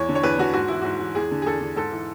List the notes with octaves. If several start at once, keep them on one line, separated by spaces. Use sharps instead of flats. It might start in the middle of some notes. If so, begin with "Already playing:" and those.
Already playing: E2 C#5
D3
C#5
E2 B4
D3 F#4
G#2 F#4
E3 E4
G#2 F#4
E3
E2 G#4
D3
G#4
E2 A4
D3
G#2 A4
E3